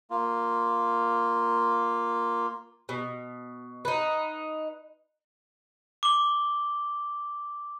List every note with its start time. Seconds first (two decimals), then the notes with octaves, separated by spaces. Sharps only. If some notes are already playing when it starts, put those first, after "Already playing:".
0.10 A#3 F4
2.89 B2
3.85 D#4 B4
6.03 D6 G7